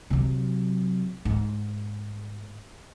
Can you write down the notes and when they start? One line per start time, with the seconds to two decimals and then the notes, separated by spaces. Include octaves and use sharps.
0.10 C3 F#3
1.25 G#2